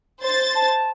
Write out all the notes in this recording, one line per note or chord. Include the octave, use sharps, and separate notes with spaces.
C5 A6
A5